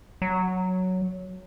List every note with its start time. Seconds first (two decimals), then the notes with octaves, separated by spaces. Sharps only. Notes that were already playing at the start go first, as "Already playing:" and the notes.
0.22 F#3